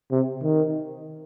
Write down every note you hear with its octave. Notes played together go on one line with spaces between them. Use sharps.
C3
D#3